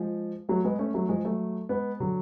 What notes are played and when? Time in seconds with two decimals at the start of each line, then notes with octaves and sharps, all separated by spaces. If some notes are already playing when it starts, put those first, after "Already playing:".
Already playing: F3 G#3
0.49 F#3 A3
0.64 G#3 B3
0.79 A3 C#4
0.94 F#3 A3
1.09 F3 G#3
1.24 F#3 A3
1.69 G#3 B3
2.00 D3 F#3